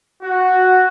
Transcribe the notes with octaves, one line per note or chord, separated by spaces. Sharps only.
F#4